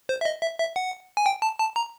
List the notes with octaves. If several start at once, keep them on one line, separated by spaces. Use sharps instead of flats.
C5
E5
D#5
E5
E5
F#5
G#5
G5
A5
A5
A#5